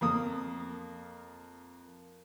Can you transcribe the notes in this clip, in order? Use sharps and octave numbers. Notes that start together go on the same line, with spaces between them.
F2 A#3 D#6